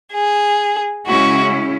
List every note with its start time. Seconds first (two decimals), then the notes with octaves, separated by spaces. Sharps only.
0.12 G#4
1.07 C#3 G#3 C#4 E4 F#4